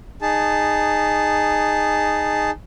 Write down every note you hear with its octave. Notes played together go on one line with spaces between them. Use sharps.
D#4 G#4 A5